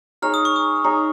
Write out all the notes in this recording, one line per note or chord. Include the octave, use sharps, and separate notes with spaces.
D#4 G#4 C#5 F6
D#6
C#6
D#6
D#4 G#4 C#5